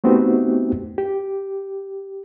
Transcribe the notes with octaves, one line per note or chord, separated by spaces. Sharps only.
A3 B3 C4 D#4 F#4 G4
G4